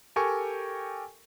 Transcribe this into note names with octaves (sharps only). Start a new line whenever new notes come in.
G4 A4 A#4 G5 G#5 C#6